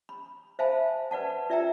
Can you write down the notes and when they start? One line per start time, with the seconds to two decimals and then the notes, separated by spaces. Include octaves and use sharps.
0.09 B5
0.59 C5 E5 F5 G#5 A5 B5
1.11 B4 D5 F#5 A5
1.50 F4 D5 E5 G5 A#5 E6